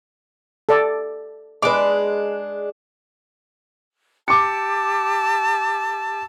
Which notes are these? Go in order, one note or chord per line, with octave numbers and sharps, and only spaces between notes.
A4 D5
G#3 D4 B4 D6
G4 A5 D6 E6 C#7